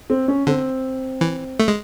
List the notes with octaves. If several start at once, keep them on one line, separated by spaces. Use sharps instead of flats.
C4
C#4
D3 C4
E3
A3
G#3